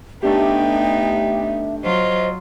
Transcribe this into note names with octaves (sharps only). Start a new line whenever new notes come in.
A3 B3 D4 D#4 G4 E5 G5
F#3 F4 C5 D#5